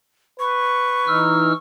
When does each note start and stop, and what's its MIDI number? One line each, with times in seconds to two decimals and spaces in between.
0.40 1.40 71
0.40 1.57 85
1.07 1.53 52
1.07 1.53 63
1.07 1.52 88
1.07 1.52 89